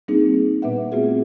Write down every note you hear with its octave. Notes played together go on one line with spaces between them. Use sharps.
G3 A#3 C4 D4 D#4 G#4
A#2 B3 B4 E5 F#5
A3 B3 C4 F4 F#4 G#4